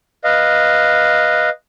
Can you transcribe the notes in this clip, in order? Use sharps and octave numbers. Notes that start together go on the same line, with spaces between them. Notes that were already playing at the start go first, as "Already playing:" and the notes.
B4 D#5 F5